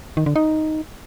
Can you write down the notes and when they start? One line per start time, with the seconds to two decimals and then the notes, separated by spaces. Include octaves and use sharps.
0.17 D#3
0.26 D3
0.36 D#4